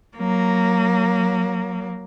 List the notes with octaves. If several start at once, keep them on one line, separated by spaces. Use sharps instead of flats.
F#3 A#3